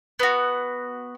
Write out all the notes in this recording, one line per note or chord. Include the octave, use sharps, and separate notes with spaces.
B3 F#4